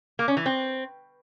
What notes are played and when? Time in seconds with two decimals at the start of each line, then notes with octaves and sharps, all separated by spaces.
0.19 A#3
0.28 C#4
0.37 E3
0.46 C4